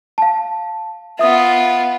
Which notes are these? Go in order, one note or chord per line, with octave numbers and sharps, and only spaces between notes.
F5 A5
B3 F4 E5 D#6